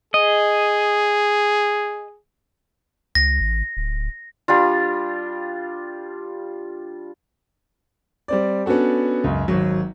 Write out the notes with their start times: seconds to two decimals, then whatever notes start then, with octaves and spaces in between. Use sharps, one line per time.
0.14 G#4 D#5
3.15 C#2 A#6
3.41 A1
3.77 D1
4.48 G3 D4 F4
8.28 G3 C4 D5
8.66 B3 C#4 D4 F#4 A4
9.24 C#2 F#2
9.48 G#1 F#3